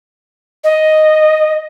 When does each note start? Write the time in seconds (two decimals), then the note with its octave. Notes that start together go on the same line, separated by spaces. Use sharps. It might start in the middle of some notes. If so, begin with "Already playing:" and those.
0.64 D#5